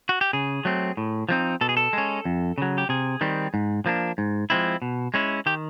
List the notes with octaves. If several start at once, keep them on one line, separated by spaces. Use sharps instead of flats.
F#4
G4
C#3 G#4
F#3 A3 C4
A2
F3 G#3 C4 D#4
B2 A4
G#4
A4
G#3 C#4
F2
C#3 F#3
G4
C3 G#4
D#3 G3 C4
G#2
F3 A#3 D4
G#2
F3 G#3 C4 E4
B2
G#3 C#4 E4
D#3 G4